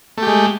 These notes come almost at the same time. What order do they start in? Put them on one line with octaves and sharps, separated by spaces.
A3 G4 G#3